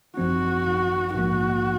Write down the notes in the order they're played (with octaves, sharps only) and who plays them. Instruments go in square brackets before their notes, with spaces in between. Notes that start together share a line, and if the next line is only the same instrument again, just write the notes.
[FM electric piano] G#1 F#2 F3 C4 [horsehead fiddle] F#4
[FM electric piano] A#1 G#2 F3 A#3 [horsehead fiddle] F#4